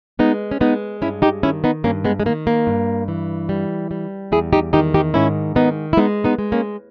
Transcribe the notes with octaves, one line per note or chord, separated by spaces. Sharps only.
G#3 B3 D#4
C#4
G#3 B3 D#4
G2 C#4 E4
D#4 G4
D#3 C#4 E4
B3 D#4
G2 A#3 C#4
G#3 B3
G#3
D#3 A#3
A#3
G2
E3
G3
G3
E2 E4 G#4
D#4 G4
D#3 D#4 G4
D#4 G4
G#2 C#4 E4
D#3 B3 D#4
E4
G#3 B3 D#4
B3 D#4
G#3
A#3 C#4